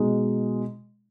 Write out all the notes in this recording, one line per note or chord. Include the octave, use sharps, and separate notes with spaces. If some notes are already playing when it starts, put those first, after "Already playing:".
Already playing: B2 G#3 D#4